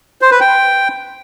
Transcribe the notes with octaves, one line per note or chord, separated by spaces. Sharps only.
C5
B4
G5